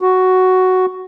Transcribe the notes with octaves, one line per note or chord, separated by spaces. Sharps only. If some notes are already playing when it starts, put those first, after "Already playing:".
F#4